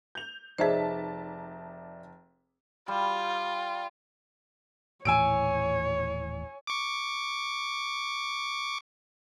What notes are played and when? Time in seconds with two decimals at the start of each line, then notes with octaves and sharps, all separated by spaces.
0.15 G6 F7
0.58 F1 D#4 G#4 C5 D5 E5 A5 B6
2.88 G3 F4
5.05 D#1 A2 E3 C#5 G#5 E6 D7
6.67 C#6 D6